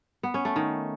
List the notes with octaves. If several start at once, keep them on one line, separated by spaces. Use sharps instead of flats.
B3
C#4
A3
D#3